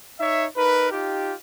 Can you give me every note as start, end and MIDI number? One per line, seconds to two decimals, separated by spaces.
0.19 0.45 63
0.19 0.45 73
0.19 0.45 76
0.56 0.91 63
0.56 0.91 70
0.56 0.91 71
0.91 1.33 63
0.91 1.33 65
0.91 1.33 67